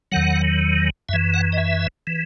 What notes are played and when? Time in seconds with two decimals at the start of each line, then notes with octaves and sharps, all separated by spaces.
0.12 E2 D#3 F#3 F#5
1.09 F#2 E3 E5
1.34 F#5
1.52 D#5
1.58 E5
2.07 E3